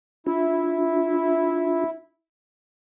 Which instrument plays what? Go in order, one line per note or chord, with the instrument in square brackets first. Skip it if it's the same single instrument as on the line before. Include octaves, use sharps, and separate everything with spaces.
[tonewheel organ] D4 F4 [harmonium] E4